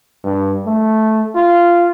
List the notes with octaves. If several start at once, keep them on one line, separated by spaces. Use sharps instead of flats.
G2
A3
F4